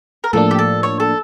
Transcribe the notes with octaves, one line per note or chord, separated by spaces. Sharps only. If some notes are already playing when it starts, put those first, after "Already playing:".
A#4
A2 F3 A#3 D4 A4
G4
A4
C#5
A4